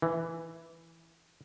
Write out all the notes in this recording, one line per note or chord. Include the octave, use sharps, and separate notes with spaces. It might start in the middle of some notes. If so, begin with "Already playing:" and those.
E3